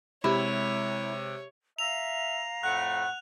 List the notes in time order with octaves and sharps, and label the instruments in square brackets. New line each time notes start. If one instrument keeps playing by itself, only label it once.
[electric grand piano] C3 [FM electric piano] G#3 G4 [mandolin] E4 [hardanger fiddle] C#5
[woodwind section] E5 [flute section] F5 A#5 [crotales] F7
[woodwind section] F2 A2 A3 [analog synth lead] F#5 [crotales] F#6